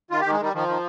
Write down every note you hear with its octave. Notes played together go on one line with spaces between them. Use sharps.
D#3 F4
D#3 G4
G#3
D#3 G3
D#3 F3
D#3